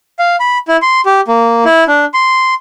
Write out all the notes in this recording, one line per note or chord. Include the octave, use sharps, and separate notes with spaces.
F5
B5
E4
C6
G4
A#3
E4
D4
C6